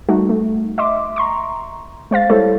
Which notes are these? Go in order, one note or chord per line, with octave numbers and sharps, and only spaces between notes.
G3 A3 D#4 F#4
A3
D#5 E5 C6 D6
A#5 C6 C#6
G#3 C5 F5 A6
G3 G#3 E4 A4 C5 C#5